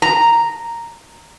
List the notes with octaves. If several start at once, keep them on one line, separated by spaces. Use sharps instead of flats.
A#5